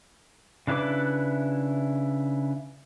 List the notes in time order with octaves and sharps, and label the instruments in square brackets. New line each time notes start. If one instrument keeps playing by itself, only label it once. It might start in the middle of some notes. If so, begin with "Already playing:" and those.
[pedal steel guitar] C#3 D4 E4 B4 D6